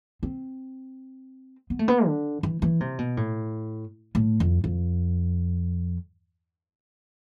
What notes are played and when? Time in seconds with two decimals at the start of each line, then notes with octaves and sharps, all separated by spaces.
0.23 C4
1.70 B3
1.79 A3
1.88 B3
2.06 D3
2.43 E3
2.62 E3
2.80 C3
2.99 B2
3.17 A2
4.15 A2
4.40 F2
4.64 F2